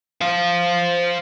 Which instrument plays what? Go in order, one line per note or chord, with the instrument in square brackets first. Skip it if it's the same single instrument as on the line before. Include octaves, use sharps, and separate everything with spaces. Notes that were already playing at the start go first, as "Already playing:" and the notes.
[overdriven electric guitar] C5 F5